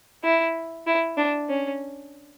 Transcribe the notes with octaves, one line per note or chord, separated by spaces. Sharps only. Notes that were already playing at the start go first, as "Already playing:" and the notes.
E4
E4
D4
C#4